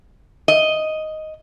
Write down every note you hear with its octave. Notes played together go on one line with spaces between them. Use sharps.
D#5